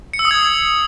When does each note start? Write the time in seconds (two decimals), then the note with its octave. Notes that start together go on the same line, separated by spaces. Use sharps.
0.13 C#7
0.19 E6
0.25 D#6
0.31 G#6